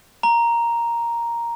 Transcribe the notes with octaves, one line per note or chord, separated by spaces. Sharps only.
A#5